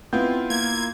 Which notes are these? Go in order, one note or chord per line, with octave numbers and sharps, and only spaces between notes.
B3 C4 E4 F4 G6
A#3 G#6